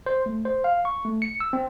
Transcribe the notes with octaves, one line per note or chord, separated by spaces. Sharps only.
C5
A3
C5
F5
C#6
A3
C#7
E6
C4